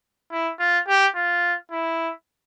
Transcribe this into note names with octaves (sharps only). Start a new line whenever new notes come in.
E4
F4
G4
F4
E4